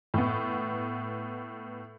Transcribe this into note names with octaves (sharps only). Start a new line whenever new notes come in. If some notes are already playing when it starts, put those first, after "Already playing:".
A2 B3